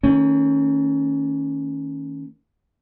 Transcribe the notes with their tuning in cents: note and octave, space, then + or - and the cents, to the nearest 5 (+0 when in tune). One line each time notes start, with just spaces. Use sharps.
D#3 +10 A3 +45 C#4 +0